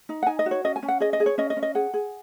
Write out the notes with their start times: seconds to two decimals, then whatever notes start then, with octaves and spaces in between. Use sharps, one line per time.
0.09 D#4
0.23 F#5
0.27 D#4 G#5
0.39 D#5
0.46 F#4
0.51 C#5
0.65 C#4 D#5
0.76 G#5
0.83 C#4
0.88 F#5
1.00 G#4 D#5
1.13 D#5
1.20 G#4
1.26 C#5
1.38 C#4 D#5
1.50 D#5
1.57 C#4
1.63 D#5
1.75 G#4 F#5
1.94 G#4